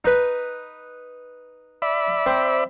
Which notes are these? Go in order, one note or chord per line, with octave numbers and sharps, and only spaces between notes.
D#4 B4
D5 E5 B5
C4